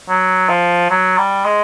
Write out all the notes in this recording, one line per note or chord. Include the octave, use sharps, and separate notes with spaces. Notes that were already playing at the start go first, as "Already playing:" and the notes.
F#3
F3
F#3
G3
G#3